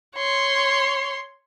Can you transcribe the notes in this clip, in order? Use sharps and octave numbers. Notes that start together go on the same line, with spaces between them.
C#5 C6